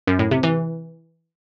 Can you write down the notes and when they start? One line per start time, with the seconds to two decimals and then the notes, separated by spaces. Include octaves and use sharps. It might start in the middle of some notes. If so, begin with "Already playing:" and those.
0.07 F#2
0.19 A2
0.31 C3
0.43 E3